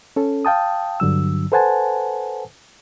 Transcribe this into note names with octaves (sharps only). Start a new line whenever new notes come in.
C#4 A4
F5 G5 A5 D#6
G2 D3 F#3 E6
A4 B4 C5 F#5 G#5 A5